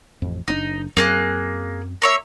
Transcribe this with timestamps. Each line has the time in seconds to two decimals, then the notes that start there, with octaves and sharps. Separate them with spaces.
0.22 A1 F2
0.48 F#1 C4 D4 D#4
0.97 F#2 F#3 A#3 C4 G#4 F#6
2.02 A#3 C#5 E5